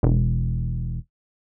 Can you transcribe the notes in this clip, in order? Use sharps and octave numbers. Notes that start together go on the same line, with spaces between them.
E1